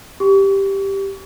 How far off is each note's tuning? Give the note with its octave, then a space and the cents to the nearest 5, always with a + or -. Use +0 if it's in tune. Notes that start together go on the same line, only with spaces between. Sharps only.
G4 +0 C#6 +40